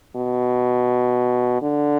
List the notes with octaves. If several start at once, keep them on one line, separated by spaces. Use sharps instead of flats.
B2
D3